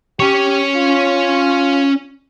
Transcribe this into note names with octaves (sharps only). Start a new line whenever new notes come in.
C#4 G4 C#5
F4